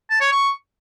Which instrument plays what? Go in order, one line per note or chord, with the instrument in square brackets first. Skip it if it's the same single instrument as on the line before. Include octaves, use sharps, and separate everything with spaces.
[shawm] A5
C#5
C#6